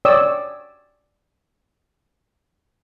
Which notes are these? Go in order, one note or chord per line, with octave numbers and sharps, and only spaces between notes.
C#5 D5 G5 D#6 E6